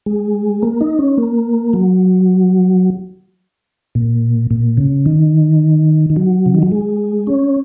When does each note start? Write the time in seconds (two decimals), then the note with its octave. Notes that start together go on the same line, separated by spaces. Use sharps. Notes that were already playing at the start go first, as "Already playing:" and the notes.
0.06 G#3
0.63 A#3
0.81 D#4
0.99 C#4
1.18 A#3
1.73 F#3
3.95 A#2
4.51 A#2
4.77 C#3
5.06 D#3
6.10 D#3
6.16 F#3
6.46 C#3
6.54 D#3
6.63 F#3
6.72 G#3
7.27 C#4